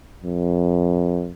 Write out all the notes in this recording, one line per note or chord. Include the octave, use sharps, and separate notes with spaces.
F2